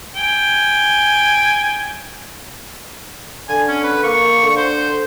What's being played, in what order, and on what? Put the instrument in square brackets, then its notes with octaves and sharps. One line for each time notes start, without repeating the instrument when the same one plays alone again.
[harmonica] G5 G#5
[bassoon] D3 [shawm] G#5
[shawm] C#4
B4
[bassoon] A#3 [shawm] C#6
[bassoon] D3
[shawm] C5